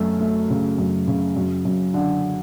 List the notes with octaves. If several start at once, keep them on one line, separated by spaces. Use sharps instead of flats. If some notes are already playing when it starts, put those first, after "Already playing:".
Already playing: F#2 A3
A3
C#3
F#2
C#3
F#2
F#2
D3